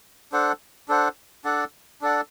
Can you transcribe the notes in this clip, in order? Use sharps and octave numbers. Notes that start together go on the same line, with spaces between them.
D4 A4 C5 F#5
D4 A4 C5 F#5
D4 A4 D5 F#5
D4 A4 D5 F#5